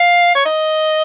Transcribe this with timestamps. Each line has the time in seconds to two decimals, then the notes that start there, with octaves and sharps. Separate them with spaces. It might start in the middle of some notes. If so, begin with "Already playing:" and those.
Already playing: F5
0.35 C#5
0.46 D#5